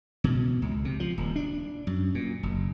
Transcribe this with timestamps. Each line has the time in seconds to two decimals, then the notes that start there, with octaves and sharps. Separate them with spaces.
0.24 B2
0.62 C#2
0.85 C3
1.00 F3
1.18 D#1
1.36 D4
1.87 F#2
2.15 A#2
2.43 F#1